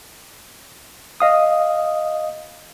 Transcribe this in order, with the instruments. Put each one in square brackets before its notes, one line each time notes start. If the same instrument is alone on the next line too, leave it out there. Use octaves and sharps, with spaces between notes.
[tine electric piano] D#5 F5 D#6